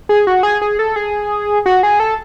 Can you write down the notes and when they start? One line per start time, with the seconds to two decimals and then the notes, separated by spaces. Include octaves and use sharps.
0.09 G#4
0.27 F#4
0.43 G#4
0.62 G#4
0.79 A4
0.96 G#4
1.66 F#4
1.83 G#4
2.00 A4